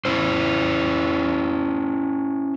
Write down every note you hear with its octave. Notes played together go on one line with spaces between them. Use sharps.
C#4 E4 C5